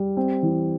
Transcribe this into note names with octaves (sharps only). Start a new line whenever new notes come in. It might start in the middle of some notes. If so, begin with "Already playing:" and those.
Already playing: G3
C4
E3